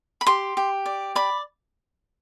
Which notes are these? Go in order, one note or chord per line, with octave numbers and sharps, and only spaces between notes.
B5
G4 C6
G4
D5
D5 B5